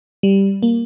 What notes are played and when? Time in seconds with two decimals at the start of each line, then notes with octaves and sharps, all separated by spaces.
0.23 G3
0.63 A#3